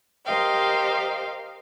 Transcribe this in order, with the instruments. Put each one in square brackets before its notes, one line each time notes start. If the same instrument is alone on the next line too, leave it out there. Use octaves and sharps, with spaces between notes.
[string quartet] G4 A#4 C5 D#5 F5 G5